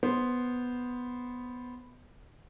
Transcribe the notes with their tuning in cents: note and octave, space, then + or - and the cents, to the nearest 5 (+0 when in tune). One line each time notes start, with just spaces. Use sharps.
B3 +0 C5 +0